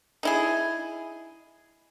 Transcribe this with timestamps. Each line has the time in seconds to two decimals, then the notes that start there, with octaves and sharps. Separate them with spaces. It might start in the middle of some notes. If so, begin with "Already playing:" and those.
0.23 D#4 E4 G#4